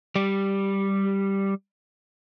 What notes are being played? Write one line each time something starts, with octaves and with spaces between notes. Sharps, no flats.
G3 G4